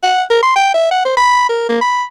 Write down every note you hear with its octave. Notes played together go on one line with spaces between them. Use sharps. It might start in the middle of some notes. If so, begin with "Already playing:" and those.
F#5
A#4
C6
G5
E5
F#5
C5
B5
A#4
A#3
B5